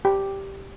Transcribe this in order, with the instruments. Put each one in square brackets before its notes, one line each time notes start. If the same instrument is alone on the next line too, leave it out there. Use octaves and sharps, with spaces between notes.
[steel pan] G4